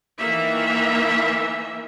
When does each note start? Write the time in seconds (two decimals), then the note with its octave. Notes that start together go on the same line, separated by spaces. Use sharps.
0.20 D#3 E3 A#3 E5